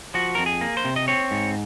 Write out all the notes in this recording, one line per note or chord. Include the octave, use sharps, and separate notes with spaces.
F3 F#4
F2 A#4
G#4
A#3
C5
C3
D#5
C4 C#5
G#2